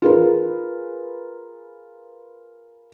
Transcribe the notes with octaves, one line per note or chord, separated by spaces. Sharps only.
F4 G#4 A#4 B4